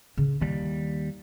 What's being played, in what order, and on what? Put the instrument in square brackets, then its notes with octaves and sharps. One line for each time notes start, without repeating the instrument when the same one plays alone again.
[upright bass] C#3
[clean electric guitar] D#2 G3 [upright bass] E4